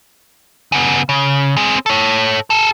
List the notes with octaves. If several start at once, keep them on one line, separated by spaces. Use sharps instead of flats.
C#3 B3
C#3
C4 G#4
A4 C#5
G#4 A4